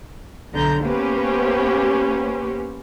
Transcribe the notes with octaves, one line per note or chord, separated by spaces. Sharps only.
B1 D3 A#5 G6
A#3 B3 C#4 G4 B4 C5